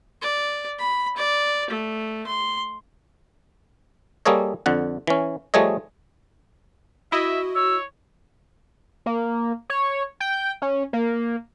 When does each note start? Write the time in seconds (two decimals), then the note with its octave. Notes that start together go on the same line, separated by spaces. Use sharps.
0.22 D5
0.79 B5
1.17 D5
1.70 A3
2.27 C6
4.25 G3 A#3 G#4 A4 C#5 D#5
4.66 F2 D3 F#5
5.07 E3 C#4
5.54 F3 G3 A3 G#4 C#5 D#5
7.12 E4 F#4 D#5 E5
7.55 C#5 E6
9.06 A#3
9.70 C#5
10.20 G5
10.62 C#4
10.93 A#3